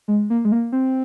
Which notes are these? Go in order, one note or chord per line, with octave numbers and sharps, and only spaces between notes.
G#3
A#3
G#3
A#3
C4